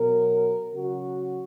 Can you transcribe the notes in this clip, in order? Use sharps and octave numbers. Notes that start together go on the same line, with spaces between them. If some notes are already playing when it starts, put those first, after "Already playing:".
Already playing: B2 F#3 A#4
C#3 F#3 F#4